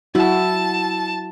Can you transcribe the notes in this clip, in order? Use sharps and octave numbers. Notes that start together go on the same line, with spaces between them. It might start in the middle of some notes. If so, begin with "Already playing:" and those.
F#3 E4 F#4 A5